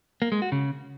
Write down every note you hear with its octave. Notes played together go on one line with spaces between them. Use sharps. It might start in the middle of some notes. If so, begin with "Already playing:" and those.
A#3
G#3
F#4
C#3